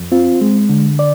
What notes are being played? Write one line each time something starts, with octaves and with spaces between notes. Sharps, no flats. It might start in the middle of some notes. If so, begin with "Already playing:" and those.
Already playing: F2
C4 F4
G#3
D3
D5